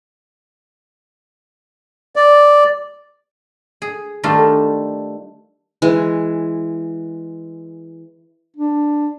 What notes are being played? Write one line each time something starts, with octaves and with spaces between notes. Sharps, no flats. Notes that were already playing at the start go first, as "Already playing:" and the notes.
D5
G#4
D#3 G3 A3 D4 F4
E3 G#3
D4